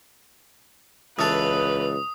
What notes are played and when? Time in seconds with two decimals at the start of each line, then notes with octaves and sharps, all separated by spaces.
1.19 C#2 E3 A4 B4 D#6